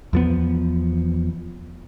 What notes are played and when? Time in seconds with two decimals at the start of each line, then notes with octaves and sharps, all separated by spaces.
0.13 E2 F3 B3